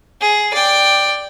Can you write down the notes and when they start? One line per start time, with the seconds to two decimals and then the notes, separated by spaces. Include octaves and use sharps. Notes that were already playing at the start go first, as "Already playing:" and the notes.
0.21 G#4
0.54 D5 G5